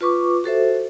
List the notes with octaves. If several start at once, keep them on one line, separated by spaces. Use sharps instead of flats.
F4 B4 C#6 D6
F#4 A4 C5 E5